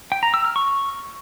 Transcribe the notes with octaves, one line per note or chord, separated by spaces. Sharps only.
G5
A#5
E6
F6
C#6